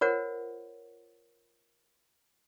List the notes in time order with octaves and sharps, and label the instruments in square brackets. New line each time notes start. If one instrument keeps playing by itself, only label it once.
[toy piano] F4 A#4 C5 C#5 F#5